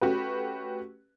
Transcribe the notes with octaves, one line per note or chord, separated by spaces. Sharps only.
A3 C#4 F#4 G4 B4